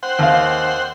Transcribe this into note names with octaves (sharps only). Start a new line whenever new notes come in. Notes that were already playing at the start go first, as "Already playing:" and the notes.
C5 F#5 G5
D#2 F5